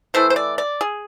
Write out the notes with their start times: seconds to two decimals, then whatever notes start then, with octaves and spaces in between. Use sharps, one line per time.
0.14 E3 A3 E4 C5
0.30 C5
0.36 D5
0.58 D5
0.81 G#4